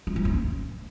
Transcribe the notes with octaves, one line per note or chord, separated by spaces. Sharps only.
C#4
F3
C#4